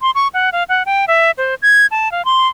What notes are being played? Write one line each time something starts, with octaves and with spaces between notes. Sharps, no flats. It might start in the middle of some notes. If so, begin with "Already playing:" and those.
C6
C#6
F#5
F5
F#5
G5
E5
C5
G#6
A5
F5
C6